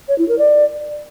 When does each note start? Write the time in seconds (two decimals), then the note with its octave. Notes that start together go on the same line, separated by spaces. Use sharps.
0.08 C#5
0.18 E4
0.28 A#4
0.39 D5